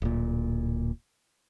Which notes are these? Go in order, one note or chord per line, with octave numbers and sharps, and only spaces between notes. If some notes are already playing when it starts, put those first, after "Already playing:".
D1 A#2